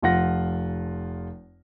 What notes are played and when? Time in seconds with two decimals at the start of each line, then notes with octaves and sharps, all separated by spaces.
0.02 F1 F3 F4 F#5 A#6